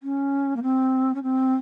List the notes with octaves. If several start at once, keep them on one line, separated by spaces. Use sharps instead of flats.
C#4
A#3
C4
C#4
C4